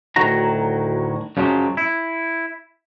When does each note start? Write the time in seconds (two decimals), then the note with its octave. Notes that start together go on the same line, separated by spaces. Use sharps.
0.16 D2 A2 D#3 F#3 F#4 A#5
1.37 F#2 C#3 F3 F#3 G#3 G4
1.77 E4